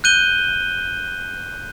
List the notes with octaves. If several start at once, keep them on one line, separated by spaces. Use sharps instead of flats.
F#6 G6 D#7 G7